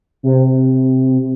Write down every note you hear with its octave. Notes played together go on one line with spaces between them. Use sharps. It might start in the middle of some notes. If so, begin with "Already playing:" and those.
C3